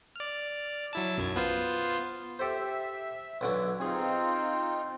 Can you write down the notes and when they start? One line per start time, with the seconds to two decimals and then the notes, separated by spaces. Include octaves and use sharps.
0.16 D5 F6
0.93 F#3 E4 A5
1.17 B1 F#2 G#6
1.36 B3 F4 C5
2.39 G4 A4 C5 E5
3.41 B1 D3 F#3
3.81 C4 D#4 F4 G#4